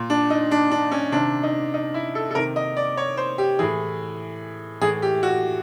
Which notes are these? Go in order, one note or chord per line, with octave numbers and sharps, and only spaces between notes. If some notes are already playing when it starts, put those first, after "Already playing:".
Already playing: A#2
D4
D#4
D4
D4
C#4
C3 D#3 D4
D#4
D#4
E4
A4
A4
C3 D#3 A#4
D#5
D5
C#5
C5
G4
A2 E3 G#4
A2 E3 G#4
G4
F#4